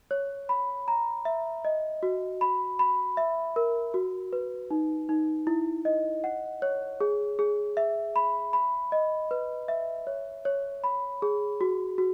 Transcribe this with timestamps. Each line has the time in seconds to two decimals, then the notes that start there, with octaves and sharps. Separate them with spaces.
0.11 C#5
0.49 B5
0.88 A#5
1.25 E5
1.65 D#5
2.03 F#4
2.41 B5
2.79 B5
3.17 E5
3.56 A#4
3.94 F#4
4.33 B4
4.71 D#4
5.09 D#4
5.47 E4
5.85 D#5
6.24 F#5
6.62 C#5
7.01 G#4
7.39 G#4
7.77 E5
8.16 B5
8.53 B5
8.92 D#5
9.31 B4
9.68 E5
10.07 C#5
10.45 C#5
10.84 B5
11.22 G#4
11.61 F#4
11.98 F#4